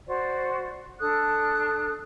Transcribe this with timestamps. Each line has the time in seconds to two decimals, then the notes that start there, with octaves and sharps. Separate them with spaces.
0.06 F#4 C5 D5
0.99 D4 A4 D#6 F#6